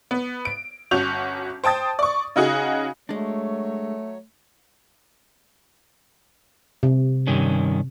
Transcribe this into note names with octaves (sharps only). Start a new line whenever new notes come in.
B3
D7
G1 C#4 F#4 G6 F7
C5 G5 A5 D#6 A6
D5 C#6
C#3 D#4 F#4 G#4
F#3 G#3 A3 D4 C#5
C3
G2 D#3 C#4